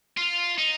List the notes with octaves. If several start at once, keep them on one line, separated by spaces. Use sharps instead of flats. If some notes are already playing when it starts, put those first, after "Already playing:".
F4
D#4